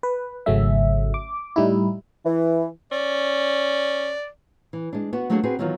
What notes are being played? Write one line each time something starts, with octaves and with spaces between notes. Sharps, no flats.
B4
G#1 C#3 F#3 A3 C#4 E5
D6
A2 G3 D#4 E4
E3
C#4 D5
E3
G#3 D4
B3 F#4
F#3 A3 A#3 D4 F#4 G#4
C4 F#4 G#4 B4
D#3 E3 F#3 B3 D#4 F4